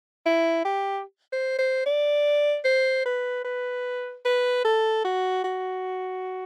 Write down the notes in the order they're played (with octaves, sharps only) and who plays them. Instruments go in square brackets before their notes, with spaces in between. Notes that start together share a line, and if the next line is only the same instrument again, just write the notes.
[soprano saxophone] E4
G4
C5
C5
D5
C5
B4
B4
B4
A4
F#4
F#4